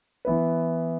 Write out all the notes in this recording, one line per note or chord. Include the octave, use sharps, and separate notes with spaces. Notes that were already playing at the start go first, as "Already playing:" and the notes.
E3 B3 E4 B4